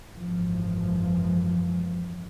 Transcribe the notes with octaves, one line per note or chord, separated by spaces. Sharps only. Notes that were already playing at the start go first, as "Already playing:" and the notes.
G#1 F#2 C3 E3 F3